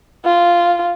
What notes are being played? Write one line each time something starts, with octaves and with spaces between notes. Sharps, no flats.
F4